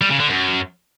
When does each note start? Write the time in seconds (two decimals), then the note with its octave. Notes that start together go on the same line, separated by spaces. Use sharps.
0.01 G3
0.11 C#3
0.20 D3
0.29 F#2